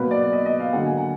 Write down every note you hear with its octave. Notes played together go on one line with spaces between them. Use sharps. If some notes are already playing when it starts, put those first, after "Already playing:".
Already playing: B2 F#3 A#3 B4
D5
D#5
D#5
F5
D3 F#3 A#3 F#5
G#5
F#5